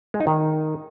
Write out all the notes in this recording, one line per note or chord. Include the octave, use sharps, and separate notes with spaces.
G#3
D#4
D#3